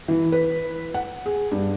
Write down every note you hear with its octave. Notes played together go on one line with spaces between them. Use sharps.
E3
B4
F#5
G#4
G2